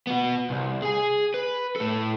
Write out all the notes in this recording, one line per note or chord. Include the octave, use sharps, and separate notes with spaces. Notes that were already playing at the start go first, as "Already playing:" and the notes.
B3 F#4
C2
G#4 G#5
B4
A2 A4